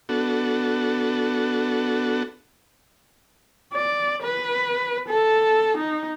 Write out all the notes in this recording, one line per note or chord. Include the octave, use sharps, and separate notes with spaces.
B3 D4 F#4 A4
D5
B4
A4
D#4